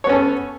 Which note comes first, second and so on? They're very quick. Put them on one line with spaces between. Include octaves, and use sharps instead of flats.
C#5 B3 C#4 A4